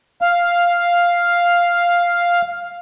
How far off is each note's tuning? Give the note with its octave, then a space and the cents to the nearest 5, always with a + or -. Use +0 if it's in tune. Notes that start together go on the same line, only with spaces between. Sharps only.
F5 +0